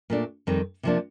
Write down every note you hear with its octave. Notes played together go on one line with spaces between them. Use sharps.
A#2 A3 D4
F2 D#3 G3 C4
C3 F3 A#3 D4